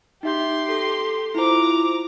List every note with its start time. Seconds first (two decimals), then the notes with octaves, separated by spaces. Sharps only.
0.23 D#4 G4 E5 C6 G6
0.69 A4
1.35 E4 F4 C5 A#5 D6